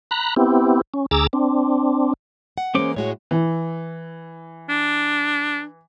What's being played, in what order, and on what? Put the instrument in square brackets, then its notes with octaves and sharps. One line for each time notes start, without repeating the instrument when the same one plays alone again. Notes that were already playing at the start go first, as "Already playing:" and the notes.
[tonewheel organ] A#5 B5 F#6
B3 C4 E4 G4
C#4
D2 G#4 A#5 D6 E6 A6
C4 D4
[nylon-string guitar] F#5
[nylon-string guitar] E3 G#3 A#3 [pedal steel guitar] C#4 C5 D6
[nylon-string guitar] A2 G#3 F#4 [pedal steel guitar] C#5
[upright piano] E3
[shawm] D4